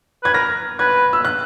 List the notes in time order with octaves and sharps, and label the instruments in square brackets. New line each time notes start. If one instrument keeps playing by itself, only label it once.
[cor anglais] B4 [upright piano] G#6
[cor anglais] A#4 [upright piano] A#6
[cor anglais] B4 [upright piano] G#6
[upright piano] E6
F#6